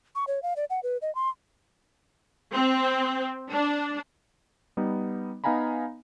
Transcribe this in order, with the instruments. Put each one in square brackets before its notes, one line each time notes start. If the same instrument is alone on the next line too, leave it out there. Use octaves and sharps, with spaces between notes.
[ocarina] C#6
C#5
F5
D5
F#5
B4
D#5
C6
[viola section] C4
D4
[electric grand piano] G3 B3 D#4
B3 D#4 F5 G#5 A#5 B5